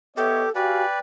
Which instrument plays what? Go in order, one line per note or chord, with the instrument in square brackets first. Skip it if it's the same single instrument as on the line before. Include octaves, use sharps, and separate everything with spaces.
[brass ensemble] B3 C#5 D#5 [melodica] G4 [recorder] A4 [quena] E5
[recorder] F#4 [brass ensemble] G4 F5 G#5 [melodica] B4 D5 [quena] G5